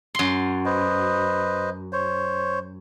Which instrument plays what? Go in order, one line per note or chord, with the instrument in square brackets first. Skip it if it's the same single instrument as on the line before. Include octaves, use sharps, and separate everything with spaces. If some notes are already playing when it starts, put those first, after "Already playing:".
[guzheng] F#2 C6
[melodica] B4 C5 D#5
C5 C#5